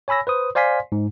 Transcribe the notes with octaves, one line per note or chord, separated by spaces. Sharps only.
C#5 G#5 B5 E6 A#6
B4 C5 D#6
C5 D5 F5 G#5 C6 B6
G#2